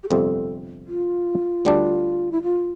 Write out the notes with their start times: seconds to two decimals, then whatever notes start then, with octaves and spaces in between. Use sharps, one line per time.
0.04 G4
0.09 G1 F2 C3 G3 C4 A4
0.87 F4
1.65 D2 D3 G3 D4
2.32 E4
2.43 F4